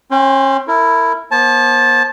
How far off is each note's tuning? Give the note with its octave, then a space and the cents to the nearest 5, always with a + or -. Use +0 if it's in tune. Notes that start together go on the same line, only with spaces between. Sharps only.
C#4 -35 G5 +0 C6 +0
E4 +0 A#4 -30
B3 -40 C5 +40 A5 -15